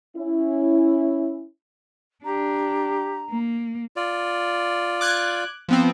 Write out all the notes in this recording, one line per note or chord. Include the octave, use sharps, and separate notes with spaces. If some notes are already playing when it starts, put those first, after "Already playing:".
C#4 E4
D4 G4 A#5
A#3
F4 D5
D6 F#6 G#6
F3 B3 C4